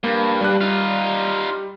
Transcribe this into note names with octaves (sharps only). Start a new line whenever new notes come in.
G2 A#3
G3 F#6
D#4 F4